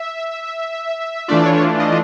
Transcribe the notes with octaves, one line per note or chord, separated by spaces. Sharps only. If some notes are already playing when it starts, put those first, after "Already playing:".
Already playing: E5
E3 A3 D4 F4 D5
C#5
D#5